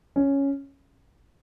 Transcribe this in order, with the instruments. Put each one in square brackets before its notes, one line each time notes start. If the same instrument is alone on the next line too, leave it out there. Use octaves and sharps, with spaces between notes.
[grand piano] C#4